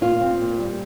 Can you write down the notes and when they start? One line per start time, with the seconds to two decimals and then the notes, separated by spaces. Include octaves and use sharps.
0.01 A#2 F4
0.21 C4
0.40 A#2
0.59 G3